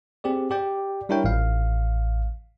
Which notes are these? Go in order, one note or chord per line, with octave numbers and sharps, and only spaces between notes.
C4 G4 G#4 D5
G4 D5 G5
G3 D4 E4 A#4 C#5 G5
A1 F5